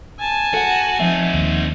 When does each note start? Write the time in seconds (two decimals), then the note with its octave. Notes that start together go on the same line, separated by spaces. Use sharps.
0.20 G#5 A5
0.54 F#4 A4 F#5
1.00 F3 C4 D#4 E5
1.34 D#2